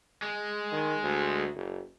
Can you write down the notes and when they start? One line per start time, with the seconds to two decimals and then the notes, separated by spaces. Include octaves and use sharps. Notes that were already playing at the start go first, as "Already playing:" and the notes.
0.22 G#3
0.72 D#3
1.02 D2
1.55 F#1